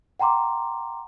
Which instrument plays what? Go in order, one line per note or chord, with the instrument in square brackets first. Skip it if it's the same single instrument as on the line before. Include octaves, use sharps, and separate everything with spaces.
[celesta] F#5 G5 A#5 C6 D6